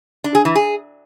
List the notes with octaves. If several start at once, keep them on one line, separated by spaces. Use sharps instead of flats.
D4
G#4
E3
G#4